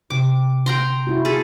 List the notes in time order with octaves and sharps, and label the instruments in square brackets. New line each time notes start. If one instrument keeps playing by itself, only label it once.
[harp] C3 [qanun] D6
[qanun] G5 A#5 C6
[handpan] E4 F#4
[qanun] G#4 A4 [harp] B6